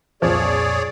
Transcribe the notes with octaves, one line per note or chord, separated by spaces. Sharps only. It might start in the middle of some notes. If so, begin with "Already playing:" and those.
C2 F2 A#2 F3 G#4 C#5 D5